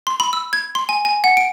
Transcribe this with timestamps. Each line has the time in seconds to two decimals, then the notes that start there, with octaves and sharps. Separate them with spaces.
0.07 C6
0.20 B5
0.33 E6
0.53 G#6
0.75 C6
0.89 G#5
1.05 G#5
1.24 F#5
1.37 D7